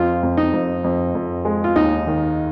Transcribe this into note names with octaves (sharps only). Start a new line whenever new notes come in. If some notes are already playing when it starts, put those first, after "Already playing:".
Already playing: F2 F4
F2
D#4
F2
F2
F2
G#3
F4
D#2 D#4
D#3